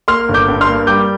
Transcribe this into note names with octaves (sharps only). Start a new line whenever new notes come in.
A#3 C6 F6
G1
D6 G6
G2
C6 F6
A#3
G3 D6 G6